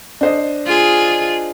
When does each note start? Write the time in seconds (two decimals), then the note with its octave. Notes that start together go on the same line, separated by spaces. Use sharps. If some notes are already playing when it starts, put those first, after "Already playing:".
0.21 D4 C5 D#5
0.66 F4 G#4